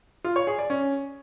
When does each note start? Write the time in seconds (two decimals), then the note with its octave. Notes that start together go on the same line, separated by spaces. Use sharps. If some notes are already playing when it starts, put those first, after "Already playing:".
0.24 F4
0.36 C#5
0.47 G#4
0.58 D5
0.70 C#4